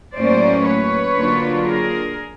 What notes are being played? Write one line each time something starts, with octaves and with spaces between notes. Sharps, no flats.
A2 F#3 A#3 C#4 C5 D5
B4 C#5
D3 F#3 A#3 D4 F4
G#4 A#4